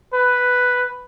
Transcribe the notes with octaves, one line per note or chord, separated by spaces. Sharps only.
B4